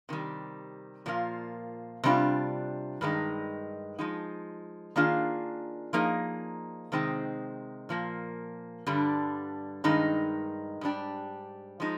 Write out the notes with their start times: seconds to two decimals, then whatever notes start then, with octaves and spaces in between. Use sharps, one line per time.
0.09 C3 D#3 G3
1.06 A#2 F3 A#3 F4
2.04 C3 G3 D4 F4
3.01 G2 D#3 G#3 D#4
3.99 F3 G#3 D#4
4.96 D#3 A#3 D4 F4 G#4
5.93 F3 A#3 D#4 G#4
6.92 C3 D#3 G#3 C4 D#4
7.89 A#2 F3 A#3
8.86 G2 D3 G3 D4
9.84 G2 D#3 G#3 D#4
10.81 G#2 G3 D4 G4
11.80 F3 G#3 D#4